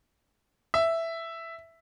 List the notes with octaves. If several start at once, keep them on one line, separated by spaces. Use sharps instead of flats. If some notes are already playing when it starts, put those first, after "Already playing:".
E5